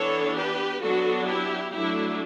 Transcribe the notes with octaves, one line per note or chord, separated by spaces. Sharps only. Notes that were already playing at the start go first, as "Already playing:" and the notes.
Already playing: E3 B3 D4 A4 C#5
G4 B4
F#3 B3 D4 F#4 A4
E4 G4
F#3 A3 D4 E4